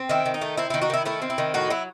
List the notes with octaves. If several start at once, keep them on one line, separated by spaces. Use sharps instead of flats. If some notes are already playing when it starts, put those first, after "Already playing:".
Already playing: C4
D#3 E4
D#3
D#4
A3
C4 E4
D#3 E4
D#4 F#4
D#3 E4
A3 E4
C4
E4
D#3
A2 D#4 F#4
F#3 E4